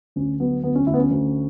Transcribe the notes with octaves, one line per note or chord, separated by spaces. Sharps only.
D2 C#4
F#3 B3
D2 B3
C#4
D2 E4
B3
C#4
D2